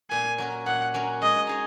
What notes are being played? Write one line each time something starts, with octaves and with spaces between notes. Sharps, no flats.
A#2 G#5
F#3 C#4 F#4 A#4
A#2 F#5
F#3 C#4 F#4 A#4
G#3 D#5
D#4 G#4 C#5